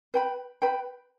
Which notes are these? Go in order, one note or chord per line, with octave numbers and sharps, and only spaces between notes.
B4 G5 B5
B4 G5 B5